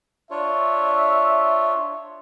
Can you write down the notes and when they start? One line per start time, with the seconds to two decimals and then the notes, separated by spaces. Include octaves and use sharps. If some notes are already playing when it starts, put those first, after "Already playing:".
0.31 D4 F4 C#5 E5